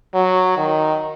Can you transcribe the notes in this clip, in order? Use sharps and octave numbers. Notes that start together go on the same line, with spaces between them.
F#3
D#3